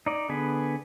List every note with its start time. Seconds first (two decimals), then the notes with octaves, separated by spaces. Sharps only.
0.06 D#4 D5
0.29 D3 B3 G#4 B4